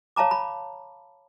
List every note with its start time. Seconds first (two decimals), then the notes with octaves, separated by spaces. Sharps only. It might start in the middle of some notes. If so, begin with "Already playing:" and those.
0.16 C#5 F5 A5 A#5 D6
0.31 B5